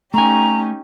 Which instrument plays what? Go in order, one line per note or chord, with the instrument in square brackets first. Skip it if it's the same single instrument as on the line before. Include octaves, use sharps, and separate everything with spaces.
[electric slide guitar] A3 G#5 [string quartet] C#4 D#4 G4 [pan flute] A#5